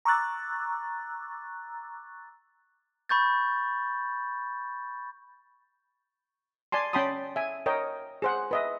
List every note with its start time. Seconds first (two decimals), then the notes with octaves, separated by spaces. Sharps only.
0.05 A#5 C#6 D6 E6 F#6 A6
3.09 B5 C#6 G6 A6
6.72 D5 G#5 A5 C6
6.93 C#4 G5 A5 B5 C6 D#6
7.36 E5 G#5
7.66 A#4 C#5 D#5 G5
8.22 G#4 C5 F#5
8.51 B4 D#5 E5